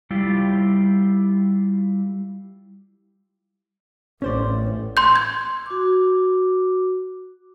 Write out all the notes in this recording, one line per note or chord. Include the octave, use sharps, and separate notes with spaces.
G3 E4 F4 G4
A1 C#4 C5 D5
C6 E6 G6
C6 G#6
F#4 D6